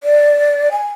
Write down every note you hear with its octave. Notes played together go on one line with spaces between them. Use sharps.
D5
G#5